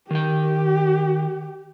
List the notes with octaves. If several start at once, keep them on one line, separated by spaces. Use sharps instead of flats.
D#3 G4 G5